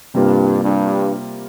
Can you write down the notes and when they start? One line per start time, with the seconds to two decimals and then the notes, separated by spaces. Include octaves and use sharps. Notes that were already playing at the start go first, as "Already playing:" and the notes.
0.14 G2 C3 G3 A#3 F4
0.63 G2